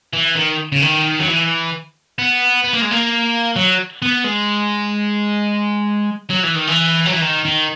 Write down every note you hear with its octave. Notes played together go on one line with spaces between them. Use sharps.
E3
D#3
C#3
D#3
F#3
E3
B3
B3
A#3
G#3
A#3
F#3
B3
G#3
F#3
E3
D#3
E3
F#3
E3
D#3
D#3